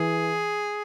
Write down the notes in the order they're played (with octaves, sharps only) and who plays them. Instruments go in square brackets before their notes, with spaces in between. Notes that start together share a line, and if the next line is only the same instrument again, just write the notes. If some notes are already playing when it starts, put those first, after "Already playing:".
Already playing: [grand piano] E3 [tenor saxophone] G#4